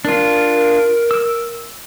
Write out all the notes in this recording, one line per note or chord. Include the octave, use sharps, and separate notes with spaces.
D4 F4 A#4
E6